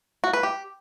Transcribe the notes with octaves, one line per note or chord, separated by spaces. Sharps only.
F#4
B4
G4